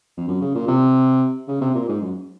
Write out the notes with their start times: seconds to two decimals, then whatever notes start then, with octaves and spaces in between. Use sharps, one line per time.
0.17 F2
0.28 F#2
0.41 C#3
0.55 A#2
0.68 C3
1.48 C#3
1.61 C3
1.75 A#2
1.89 G#2
2.01 F#2